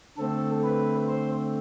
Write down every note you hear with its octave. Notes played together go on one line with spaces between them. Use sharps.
D3 A3 C4 A4
B4
C5